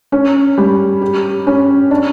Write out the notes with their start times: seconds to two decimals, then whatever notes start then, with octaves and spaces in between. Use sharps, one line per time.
0.12 C#4
0.58 G3
1.02 G4
1.47 C#4
1.91 D4